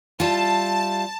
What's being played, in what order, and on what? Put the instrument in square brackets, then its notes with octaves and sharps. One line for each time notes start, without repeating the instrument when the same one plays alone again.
[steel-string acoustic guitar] G3 E4 F4 [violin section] A5